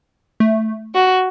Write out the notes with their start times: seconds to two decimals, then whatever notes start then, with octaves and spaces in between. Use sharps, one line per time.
0.40 A3
0.95 F#4